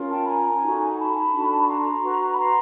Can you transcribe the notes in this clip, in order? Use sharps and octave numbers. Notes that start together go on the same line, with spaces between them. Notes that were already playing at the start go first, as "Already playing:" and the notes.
Already playing: C#4 F4 A#4
G5 A5
B5
G#5 A#5
D#4 F#4 A4
A5 B5
D4 F#4 A4
B5
A#5 C6
F#4 B4
B5
A#5 C6